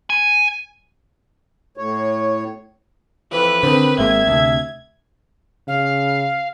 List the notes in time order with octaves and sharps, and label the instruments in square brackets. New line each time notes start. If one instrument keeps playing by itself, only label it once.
[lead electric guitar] G#5
[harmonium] A2 C#5
[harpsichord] F2 E3 [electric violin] B4
[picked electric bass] D3 [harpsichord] D#3 C4
[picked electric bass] G#1 G#3 A#3 [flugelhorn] E5 [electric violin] G#6
[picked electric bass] D2 C3
[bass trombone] C#3 [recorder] F5